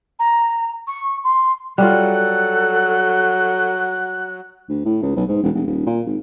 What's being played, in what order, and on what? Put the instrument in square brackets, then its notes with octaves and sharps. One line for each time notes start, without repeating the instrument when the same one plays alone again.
[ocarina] A#5
C#6
C6
[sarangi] F#3 [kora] G3 F4 [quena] A4 [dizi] F#6
[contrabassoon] D2
A2
C#2
B1
G#2
E1
F1
D#1
A#2
G#1